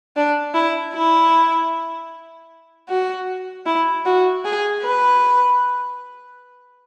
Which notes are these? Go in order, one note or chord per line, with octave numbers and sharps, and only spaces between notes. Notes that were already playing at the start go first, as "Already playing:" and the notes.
D4
E4
E4
F#4
E4
F#4
G#4
B4